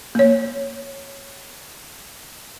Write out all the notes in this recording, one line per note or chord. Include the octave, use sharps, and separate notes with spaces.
A#3 C#5